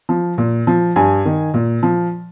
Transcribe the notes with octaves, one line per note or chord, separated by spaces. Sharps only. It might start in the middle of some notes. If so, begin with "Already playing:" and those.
F3
A#2
F3
G2 G#5
D#3
A#2
F3